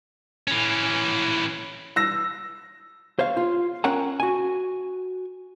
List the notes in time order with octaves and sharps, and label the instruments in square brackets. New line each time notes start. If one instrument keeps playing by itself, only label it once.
[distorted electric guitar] E3 C#4
[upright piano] E6 A#6
[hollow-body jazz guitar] C5 C#5 F5
F4
C#4 A#4 C#5 F#5 G5 A#5
F#4 G#5